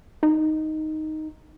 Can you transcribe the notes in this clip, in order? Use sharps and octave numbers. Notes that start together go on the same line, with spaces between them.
D#4